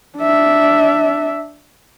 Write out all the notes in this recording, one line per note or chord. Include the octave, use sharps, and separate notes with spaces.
D4 E5